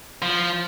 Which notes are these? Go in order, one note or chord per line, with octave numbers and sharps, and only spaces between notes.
F3